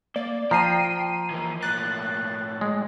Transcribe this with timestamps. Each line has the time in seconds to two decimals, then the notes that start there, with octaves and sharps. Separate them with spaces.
0.16 A#3 D5
0.51 F3 G5 A#5 C7 D#7
1.31 E3 A#3
1.62 A2 A#3 F#6 A6
2.61 G#3